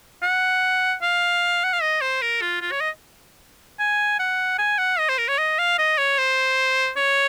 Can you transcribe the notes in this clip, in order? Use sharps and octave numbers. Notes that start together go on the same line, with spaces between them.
F#5
F5
F#5
F5
D#5
C5
A#4
F4
F4
C#5
D#5
G#5
F#5
G#5
F#5
D#5
C5
A#4
C#5
D#5
F5
D#5
C#5
C5
C#5